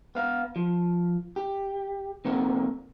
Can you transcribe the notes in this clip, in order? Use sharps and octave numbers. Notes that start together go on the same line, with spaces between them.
B3 F5
F3
G4
C3 A3 A#3 C4